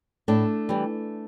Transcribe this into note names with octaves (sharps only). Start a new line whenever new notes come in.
A2 A3 D4
E3 G3